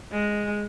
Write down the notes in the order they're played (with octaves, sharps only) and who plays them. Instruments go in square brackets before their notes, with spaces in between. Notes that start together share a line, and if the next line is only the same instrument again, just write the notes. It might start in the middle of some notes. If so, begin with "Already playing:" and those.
[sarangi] G#3